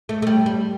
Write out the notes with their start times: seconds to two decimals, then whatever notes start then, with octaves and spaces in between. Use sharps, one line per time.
0.09 A3
0.22 A3
0.27 G3
0.46 G3